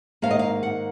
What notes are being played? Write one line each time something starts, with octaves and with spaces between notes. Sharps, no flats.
G#2 D#3 A#3 F5
D#5
F5
F#5